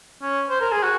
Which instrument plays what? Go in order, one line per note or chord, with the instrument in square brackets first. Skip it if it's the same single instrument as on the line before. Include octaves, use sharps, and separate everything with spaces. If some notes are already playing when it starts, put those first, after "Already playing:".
[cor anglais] C#4
C5
A#4
G#4
F#4